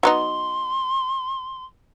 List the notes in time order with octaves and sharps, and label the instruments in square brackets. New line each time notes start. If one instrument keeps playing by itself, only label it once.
[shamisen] F#3 B3 D#4 [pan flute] C6